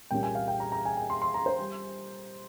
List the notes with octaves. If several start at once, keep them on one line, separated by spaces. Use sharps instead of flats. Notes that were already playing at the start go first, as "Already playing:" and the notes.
C2 A#2 G3 A#3 C#4 G5
G#5
F5
G5
A#5
A#5
G#5
G#5
C6
C6
A#5
C5
G3